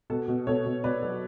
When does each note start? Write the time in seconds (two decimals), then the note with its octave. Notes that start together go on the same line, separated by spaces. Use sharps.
0.10 B2 F#4 A4
0.28 B2
0.47 B2 A4 C#5
0.65 B2
0.84 B2 B4 D5
1.02 F#3